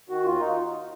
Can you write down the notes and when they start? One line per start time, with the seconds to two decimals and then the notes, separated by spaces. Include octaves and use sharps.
0.09 D#3 F#4
0.25 D#2 F4
0.40 D#4